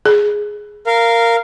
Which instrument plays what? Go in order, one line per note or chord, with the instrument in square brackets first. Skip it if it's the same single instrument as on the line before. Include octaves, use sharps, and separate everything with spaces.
[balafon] G#4
[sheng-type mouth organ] A#4 F5